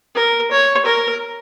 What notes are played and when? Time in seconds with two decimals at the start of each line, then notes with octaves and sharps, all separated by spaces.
0.15 A#4
0.51 C#5
0.86 A#4